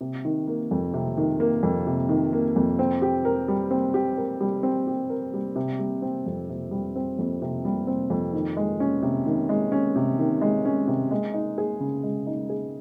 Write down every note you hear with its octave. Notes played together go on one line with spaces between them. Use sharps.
C3
D#3
A#3
F2
C3
D#3
A#3
F2
C3
D#3
A#3
F2
C4
G4
A#4
G3
C4
G4
A#4
G3
C4
G4
A#4
G3
C3
G3
C4
F2
C3
G3
C4
F2
C3
G3
C4
F2
D#3
G#3
C#4
C3
D#3
G#3
C#4
C3
D#3
G#3
C#4
C3
G#3
D#4
G#4
C#3
G#3
D#4
G#4